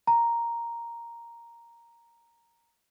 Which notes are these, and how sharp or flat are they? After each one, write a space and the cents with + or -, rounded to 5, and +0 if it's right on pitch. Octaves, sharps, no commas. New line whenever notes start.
A#5 +0